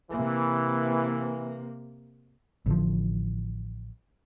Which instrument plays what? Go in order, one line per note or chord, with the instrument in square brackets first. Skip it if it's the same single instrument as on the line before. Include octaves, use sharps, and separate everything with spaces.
[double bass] C3 A#3 [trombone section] E3
[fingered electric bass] A1 D3 F3